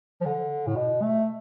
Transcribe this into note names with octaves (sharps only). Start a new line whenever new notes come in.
F3
D3
A2
B2
A3